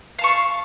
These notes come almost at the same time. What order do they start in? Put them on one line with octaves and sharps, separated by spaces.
F5 A5 C#6